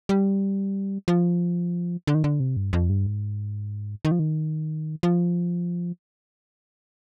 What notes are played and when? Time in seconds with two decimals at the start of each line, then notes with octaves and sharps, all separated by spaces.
0.09 G3
1.08 F3
2.07 D3
2.15 D#3
2.24 D3
2.40 C3
2.57 G2
2.73 F2
2.90 G2
3.06 G#2
4.05 D#3
4.11 F3
4.19 D#3
5.03 F3